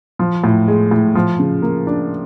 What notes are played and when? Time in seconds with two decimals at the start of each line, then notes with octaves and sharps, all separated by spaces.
0.19 F3
0.44 A2
0.68 G#3
0.91 A2
1.15 F3
1.39 C#3
1.62 A#3
1.87 D4